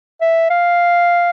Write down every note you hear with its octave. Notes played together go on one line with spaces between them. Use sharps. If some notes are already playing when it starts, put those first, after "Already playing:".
E5
F5